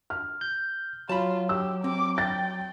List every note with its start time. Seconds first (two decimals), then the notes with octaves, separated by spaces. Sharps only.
0.10 F6
0.41 G6
1.09 F#3 F4 A5 B5
1.49 G4 E6
1.84 C4 D6
2.18 G5 A6